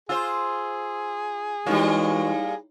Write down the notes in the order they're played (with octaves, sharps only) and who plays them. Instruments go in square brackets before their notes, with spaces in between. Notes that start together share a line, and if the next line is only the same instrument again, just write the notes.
[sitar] F4 C5 [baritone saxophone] G#4 [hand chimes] E6
[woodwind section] E3 G#3 F#4 [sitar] G3 A#3 [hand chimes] D#4 E4 C#5